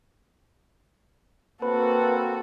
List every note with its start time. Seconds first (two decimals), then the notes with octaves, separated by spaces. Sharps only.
1.62 A#3 C4 F#4 A4 B4